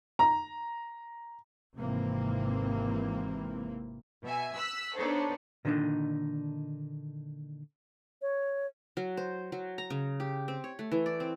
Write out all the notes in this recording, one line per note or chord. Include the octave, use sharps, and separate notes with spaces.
A#5
G#1 C3 E3 A#3 C4
B2 E5 G#5
E6 F#6 B6
B3 D4 D#4 A4 C5 C#5
A#2 D3 D#3 C4 D4 D#4
C#5
F#3
C5
F#3
A#5
C#3
G4
C4
C#5
A3
E3
D5
C4